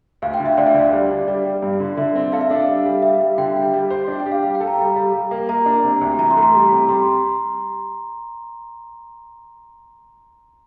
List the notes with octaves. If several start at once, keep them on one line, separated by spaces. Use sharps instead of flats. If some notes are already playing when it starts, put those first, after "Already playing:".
D2 F5
G5
D3
E5
D2 D5
E5
D3 D5
G3
D4
G3 D5
G3
G2
D3
D3 E5
C4
A4 F5
E5
D4 F5
G3
G3
G3 E5
G3
D3 G5
G3
G3
C5
D4
G5
G4
F5
G3 F5
G5
A4
A#5
G3
G3
G3
A#3
A#3 A#5
D4
C3
D2
E3 A#5
C6
A3
A#5
G3
C3
G3 C6